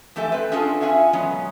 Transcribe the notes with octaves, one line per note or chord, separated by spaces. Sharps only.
F2 A3 G4 A4 E5 G#5
C4 B4
C#4 D4 F4 F#4 G#4 A4
C#4 F4 E5 F#5 G#5
B2 F#3 G#3 B3 C#4